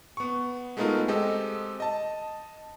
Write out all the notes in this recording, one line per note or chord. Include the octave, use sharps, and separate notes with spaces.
B3 C#6
G#3 A3 B3 D#4 F4 A#4
G#3 C4 G4 A4 D#5
D#5 A5